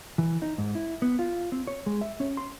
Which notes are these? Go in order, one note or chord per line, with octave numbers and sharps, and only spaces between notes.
E3
D#4
G#2
E4
B3
F4
C4
C#5
G#3
E5
C#4
C6